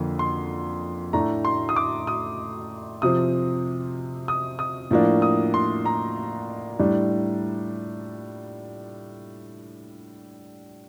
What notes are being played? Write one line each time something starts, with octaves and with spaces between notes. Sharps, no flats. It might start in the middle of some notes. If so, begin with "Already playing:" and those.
Already playing: F2 D3 A#3
C6
A2 A3 D4 A#5
C6
D#6
D6
D#6
C3 F3 C4 D#6
D#6
D#6
A2 F3 A#3 D4
D#6
C6
A#5
A2 G3 D4